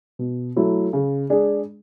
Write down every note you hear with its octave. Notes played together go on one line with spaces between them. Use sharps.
B2
F#3 A3 E4
C#3
G#3 D4 G#4